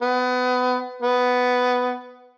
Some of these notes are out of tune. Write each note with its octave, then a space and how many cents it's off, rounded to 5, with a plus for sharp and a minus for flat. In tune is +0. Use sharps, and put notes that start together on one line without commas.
B3 +25
B3 +10